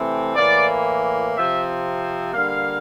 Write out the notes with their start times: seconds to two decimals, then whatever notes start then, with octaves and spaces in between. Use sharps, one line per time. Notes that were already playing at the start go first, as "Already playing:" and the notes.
Already playing: C3 E3 A3 C4
0.36 A2 E3 A#3 D5
1.35 C3 F3 C4 E5
2.33 D3 G3 A#3 F5